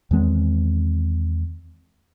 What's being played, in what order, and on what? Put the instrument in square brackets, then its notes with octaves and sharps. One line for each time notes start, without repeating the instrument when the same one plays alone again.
[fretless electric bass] E2 D#3 G#3 C4